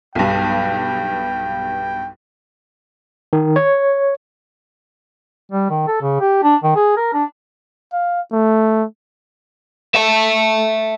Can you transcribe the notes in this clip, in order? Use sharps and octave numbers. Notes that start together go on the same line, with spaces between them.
B1 G2 G5
D#3
C#5
G3
D#3
A4
C#3
G4
D4
D#3
G#4
A#4
D4
F5
A3
E5 A5